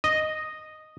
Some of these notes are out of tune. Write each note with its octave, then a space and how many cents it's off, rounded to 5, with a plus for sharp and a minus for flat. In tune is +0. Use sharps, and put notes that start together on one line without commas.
D#5 -5